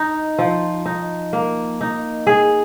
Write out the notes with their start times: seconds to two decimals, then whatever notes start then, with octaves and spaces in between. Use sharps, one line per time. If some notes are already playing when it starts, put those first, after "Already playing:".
Already playing: D#4
0.38 F3
0.86 D#4
1.33 A#3
1.81 D#4
2.27 G#4